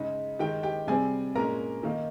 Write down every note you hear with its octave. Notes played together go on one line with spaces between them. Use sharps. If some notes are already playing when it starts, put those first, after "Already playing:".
Already playing: C#3 G#3 D#4
D#3 G#3 D#4 G4 G5
G4 G5
C3 G3 C4 G#4 G#5
A#2 G#3 C#4 A#4 A#5
D#3 A#3 D#4